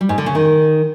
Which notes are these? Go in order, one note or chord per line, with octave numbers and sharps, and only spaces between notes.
G3
G#2
D3
C#3
D#3